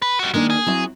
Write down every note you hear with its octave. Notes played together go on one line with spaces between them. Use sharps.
B4
G3 F#4
D#3 G#3 A#3 D4
G#4
F#3 C4 E4